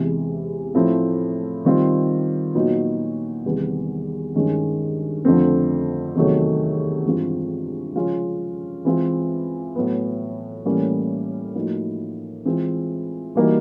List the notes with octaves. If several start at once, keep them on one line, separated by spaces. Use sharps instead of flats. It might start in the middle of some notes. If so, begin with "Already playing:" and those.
Already playing: E2 C3 E3 G#3
A2 F3 A3 C4 E4
D#3 G3 C4 F4
A#2 F#3 B3 D#4 F#4
E2 C3 D#3 G3 B3
G2 D#3 G#3 C#4
F2 D3 F3 A3 C4
E2 C3 D#3 F#3 A3
G2 E3 G#3 C4 F4
C#3 F3 G#3 C#4 F4
E3 G#3 C4 F4
A2 F#3 B3
A2 E3 G3 A#3 C#4
A2 F3 A#3 D#4 F#4
E3 G#3 C4 F4
E3 G3 A#3 D#4 F#4